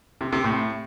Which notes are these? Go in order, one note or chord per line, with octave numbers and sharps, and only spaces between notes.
C3
C3
A2